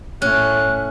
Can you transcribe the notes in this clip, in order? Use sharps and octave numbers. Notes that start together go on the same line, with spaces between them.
A2 C#4 F#6